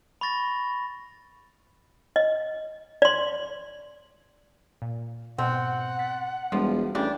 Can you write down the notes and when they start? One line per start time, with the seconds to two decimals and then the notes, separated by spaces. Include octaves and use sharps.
0.21 B5 C#6 A6 A#6
2.16 D#5
3.02 D5 C6
4.82 A#2
5.38 G#2 B2 C4 F#5
5.99 A6 B6
6.52 E1 F3 G3 G#3 D#7
6.95 A1 C#3 D4 G5